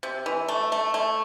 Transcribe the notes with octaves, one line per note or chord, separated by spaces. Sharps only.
C3
E3
A3
A3
A3